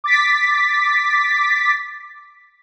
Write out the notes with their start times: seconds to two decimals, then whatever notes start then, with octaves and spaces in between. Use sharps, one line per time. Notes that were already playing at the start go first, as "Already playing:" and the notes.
0.04 D6 A6 B6